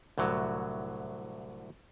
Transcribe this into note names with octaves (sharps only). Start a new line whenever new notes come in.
C2 A2 D3 F#3